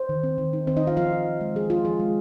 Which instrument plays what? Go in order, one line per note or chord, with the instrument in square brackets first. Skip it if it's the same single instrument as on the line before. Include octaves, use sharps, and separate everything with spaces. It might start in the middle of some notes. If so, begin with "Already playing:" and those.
Already playing: [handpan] C5
D#3
C4
D#3
D#4
D#3 C4 C5
D#4 D#5
C4 F4 F5
F3 F4 F5
F4
F3
G#3
F3 G#4
F4
F3 G#4
G#3